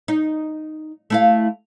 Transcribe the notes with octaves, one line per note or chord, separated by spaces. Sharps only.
D#4
A3 E4 F5